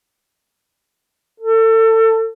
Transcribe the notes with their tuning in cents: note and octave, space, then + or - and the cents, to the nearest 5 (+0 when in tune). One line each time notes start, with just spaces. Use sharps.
A4 +30